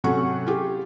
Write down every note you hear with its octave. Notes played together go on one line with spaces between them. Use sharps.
C3 F#3 A3 C#4 F#5 C#6
F4 G4 G#4